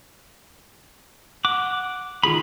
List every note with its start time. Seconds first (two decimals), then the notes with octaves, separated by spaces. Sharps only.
1.45 F#5 D6
2.23 D#3 F4 G#4 B5